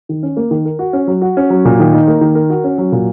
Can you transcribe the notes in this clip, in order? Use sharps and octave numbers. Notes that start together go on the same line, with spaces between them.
D#3
C#4
A#3
D#3
A#4
F#4
C#4
F#3
F#4
C#4
F#3
A#2
D#3
D#4
A#3
D#3
A#4
F#4
C#4
F#3
A#2